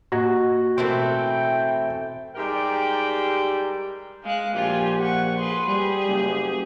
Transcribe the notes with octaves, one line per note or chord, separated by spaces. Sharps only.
A2 A#3 F#4 D#5 G#6
B2 E3 A3 C4 A#4 G5
G#2 G3 G4 A#4 D5 G5
G#3 F5 F#6
A#1 F4 G4 G#5
F#5 C#6
G#4 B4 C6
G3 G4 G#4
F#1